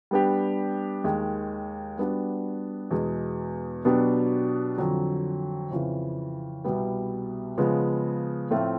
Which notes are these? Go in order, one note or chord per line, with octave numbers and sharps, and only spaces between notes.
G3 B3 D4 G4
D#2 D#3 G#3
G3 B3 D4 F#4
E2 B2 G#3
B2 F#3 B3 D4 G4
F2 D3 F#3
F2 C#3 E3
C2 B2 G3 B3
C#3 F3 G#3 B3
A2 F3 A3 C4 F4